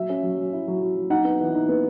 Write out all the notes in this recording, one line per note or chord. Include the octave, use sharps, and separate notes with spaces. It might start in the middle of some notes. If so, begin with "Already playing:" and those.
Already playing: F#3 E5
C#4
F#3
F#3
E4
F#3
F#3
F#3
D#4 F#5
B3
E3
D#4
B3